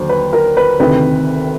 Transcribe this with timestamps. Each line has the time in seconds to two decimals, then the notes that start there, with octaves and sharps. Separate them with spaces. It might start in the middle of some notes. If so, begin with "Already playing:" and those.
Already playing: D#2 D3 F#3 C5
0.09 B4
0.33 A#4
0.57 B4
0.79 D2 C3 D#3 B4